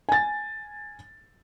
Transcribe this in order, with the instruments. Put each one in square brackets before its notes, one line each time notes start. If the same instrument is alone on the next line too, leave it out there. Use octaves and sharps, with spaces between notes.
[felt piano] G#5 A6